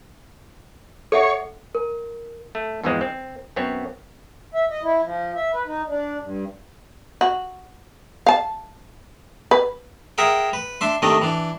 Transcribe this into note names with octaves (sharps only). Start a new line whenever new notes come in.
A4 C#5 E5 F#5
A#4
A3
E2 G#2 E3 F3 G#3 C4
C4
F#2 B3 C4 C#5
E5
D#5
E4
F3
E5
B4
D#4
D4
G2
F#4
F5 A5
B4
G#4 A#4 E5 F#5 G5
B4
D4 E5 C6
C3 D#3 A3 D4 D#5
E3 D4